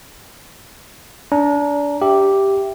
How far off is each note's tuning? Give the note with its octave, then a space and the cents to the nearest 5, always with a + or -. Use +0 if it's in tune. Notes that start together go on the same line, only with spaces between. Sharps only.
D4 -30 A#5 +0
G4 +0 E5 +10